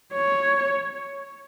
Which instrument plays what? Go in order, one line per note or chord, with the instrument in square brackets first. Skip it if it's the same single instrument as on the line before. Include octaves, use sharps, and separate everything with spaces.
[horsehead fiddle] C#5